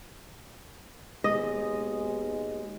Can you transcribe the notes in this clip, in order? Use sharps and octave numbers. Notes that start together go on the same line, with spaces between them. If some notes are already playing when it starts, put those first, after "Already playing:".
D#2 B2 G#3 D#5